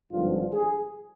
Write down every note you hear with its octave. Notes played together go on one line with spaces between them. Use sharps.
G#1 G2 D3 F3 F4
G#4